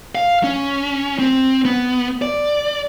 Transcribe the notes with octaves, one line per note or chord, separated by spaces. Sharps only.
F5
C#4
C4
B3
D5